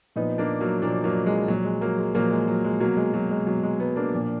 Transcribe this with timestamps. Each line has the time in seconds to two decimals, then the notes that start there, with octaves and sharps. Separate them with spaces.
0.16 A#2 F3 B3 D#4
0.38 A#3 D4
0.60 F#3 A#3
0.82 A#2 F3 A#3 D4
1.04 F#3 A#3
1.26 G#3
1.48 A#2 F3 F#3
1.64 G#3
1.81 F#3 A#3
1.98 G#3
2.14 A#2 F3 F#3 A#3
2.31 G#3
2.48 F#3
2.64 G#3
2.80 B2 F#3 A#3
2.97 G#3
3.14 F#3
3.30 G#3
3.47 B2 F#3
3.63 G#3
3.79 G#3 B3
3.96 A#3 D4
4.13 A#2 F3